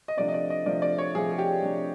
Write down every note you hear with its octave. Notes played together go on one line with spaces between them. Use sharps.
D#5
C3 F3 A3 D4 D5
D#5
D5
D#5
C3 F3 A3 D4 D5
D5
C#5
C3 F3 A3 D4 G#4
G#4
G4
C3 F3 A3 D4